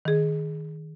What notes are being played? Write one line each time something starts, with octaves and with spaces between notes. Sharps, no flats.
D#3 G#4